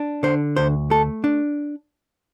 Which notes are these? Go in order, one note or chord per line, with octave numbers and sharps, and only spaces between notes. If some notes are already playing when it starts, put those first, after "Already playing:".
Already playing: D4
D3 C5
D2 C5
A3 A4
D4